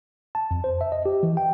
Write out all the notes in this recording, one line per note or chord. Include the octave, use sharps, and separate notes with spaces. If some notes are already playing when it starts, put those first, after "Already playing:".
A5
F2
C5
E5
D#5
G4
E3
G5